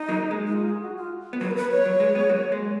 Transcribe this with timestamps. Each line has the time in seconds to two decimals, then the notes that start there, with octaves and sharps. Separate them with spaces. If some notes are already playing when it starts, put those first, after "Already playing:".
Already playing: D#4
0.08 F#3 A#3
0.31 G#3
0.47 D#4
0.53 F4
0.67 G#4
0.82 F#4
0.97 F4
1.33 B3
1.41 F#3 A#3 B4
1.51 A#4
1.56 B4
1.71 C#5
1.86 F#3
2.00 G#3
2.15 G#3 B3
2.29 F#3 A#3
2.52 G#3